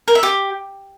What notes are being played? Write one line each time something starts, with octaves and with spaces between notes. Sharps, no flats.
A#4
E5
G4